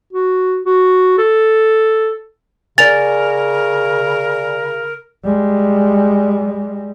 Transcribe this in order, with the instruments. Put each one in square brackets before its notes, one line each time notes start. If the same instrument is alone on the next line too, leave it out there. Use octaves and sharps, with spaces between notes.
[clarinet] F#4
F#4
A4
[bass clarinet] C#3 [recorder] A#4 [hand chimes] D5 G#5 [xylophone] A6 F7
[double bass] G3 G#3